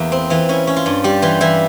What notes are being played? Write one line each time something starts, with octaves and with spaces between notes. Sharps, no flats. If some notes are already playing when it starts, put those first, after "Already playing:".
Already playing: E2 A#3 E5
C4
E3 F4
C#4 E4
C#4
F4
G2
G3 G4
E3 F4
E3 E4